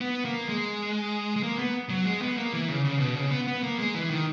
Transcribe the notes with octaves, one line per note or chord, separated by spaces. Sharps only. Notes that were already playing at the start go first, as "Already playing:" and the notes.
B3
A#3
G#3
G#3
A#3
B3
F#3
G#3
B3
A#3
E3
C#3
C#3
B2
C#3
B3
B3
A#3
G#3
E3
D#3